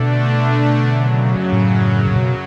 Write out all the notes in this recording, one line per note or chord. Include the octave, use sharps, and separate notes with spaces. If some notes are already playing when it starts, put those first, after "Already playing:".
Already playing: B2 D3 A3 D4
F#2 C#3 F#3
A2
A2
B2 F#3